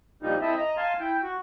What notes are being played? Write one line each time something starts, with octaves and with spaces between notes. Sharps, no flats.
A#2 F3 G3 D#4
C4 E4 A4 D#5 E5
D#5 A#5
F5 G#5 A5 C6
E4 G5
F#4